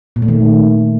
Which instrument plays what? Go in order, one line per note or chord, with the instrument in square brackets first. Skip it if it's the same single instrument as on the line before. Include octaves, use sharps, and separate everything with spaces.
[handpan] A#2
A3
D#3